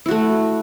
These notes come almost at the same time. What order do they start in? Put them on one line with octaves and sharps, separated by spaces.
E4 F#4 A3